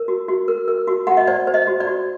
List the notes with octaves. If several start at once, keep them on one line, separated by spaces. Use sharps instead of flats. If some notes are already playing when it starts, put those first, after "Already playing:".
Already playing: A#4
F#4
F#4
A#4
A#4
F#4
F#4 F#5
D#5
C5 D5
C5
D#5
F#4
D5
F#4